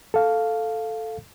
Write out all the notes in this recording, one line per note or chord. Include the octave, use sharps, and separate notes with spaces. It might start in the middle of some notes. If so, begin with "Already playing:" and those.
A4 F5